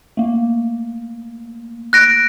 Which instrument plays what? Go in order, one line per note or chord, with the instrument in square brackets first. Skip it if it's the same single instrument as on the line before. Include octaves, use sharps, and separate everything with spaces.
[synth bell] A3 A#3
[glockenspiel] F#6 A#6 D7